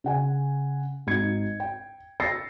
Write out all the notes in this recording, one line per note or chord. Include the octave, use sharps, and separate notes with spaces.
C#3 F#5 G#5
G#1 D#4 F#4 G#6 C#7
G5
E6 A6 A#6 C7 C#7